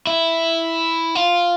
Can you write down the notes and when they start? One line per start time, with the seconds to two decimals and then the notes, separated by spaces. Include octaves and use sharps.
0.07 E4
1.15 F4